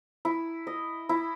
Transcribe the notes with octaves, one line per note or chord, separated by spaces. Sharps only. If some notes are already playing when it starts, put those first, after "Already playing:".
E4
D#5
E4